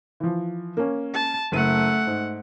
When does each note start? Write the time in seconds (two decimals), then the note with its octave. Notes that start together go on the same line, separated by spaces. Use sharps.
0.20 E3 F3
0.77 A#3 C#4
1.14 A5
1.52 F#1 A3 F#5 D#7
2.07 G#2